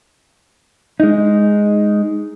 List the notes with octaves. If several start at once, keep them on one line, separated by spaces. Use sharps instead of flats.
G#3 D#4